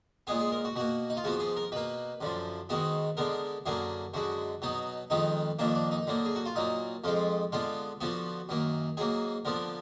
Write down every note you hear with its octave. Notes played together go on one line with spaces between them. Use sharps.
A#2 G#3 B3 G#4
G#4
A#4
F#4
B2 A#3 F#4
D#4
F4
G#2 F3 B3 F#4
G#4
A#4
B2 A#3 B4
F#2 D3 F3
G#2 D#3 G#3 B3 F#4
D3 G#3 B3 A#4
F#2 D3 F#3 A#3 G#4
F#2 D3 G#3 F#4
B2 F#3 B3 D#4
F2 D#3 G#3 B3 D#4
F2 D#3 A#3 D4
D4
D#4
D3 F#3 A#3
G#4
F#4
F4
A#2 F#3 A#3 D#4
F2 F3 G#3 F4
D3 G#3 B3 F4
D3 F3 B3 F#4
F#2 D#3 A#3
G#2 F#3 A#3 G#4
D3 F3 B3 A#4